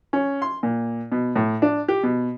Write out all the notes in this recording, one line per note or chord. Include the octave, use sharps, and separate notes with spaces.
C#4
C6
A#2
B2
A2
D4
G4
B2